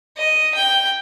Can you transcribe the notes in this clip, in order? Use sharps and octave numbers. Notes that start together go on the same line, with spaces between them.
D#5
G5